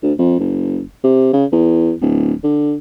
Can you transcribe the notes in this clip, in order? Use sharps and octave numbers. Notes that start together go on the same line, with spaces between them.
D2
F2
F#1
C3
C#3
E2
D1
D3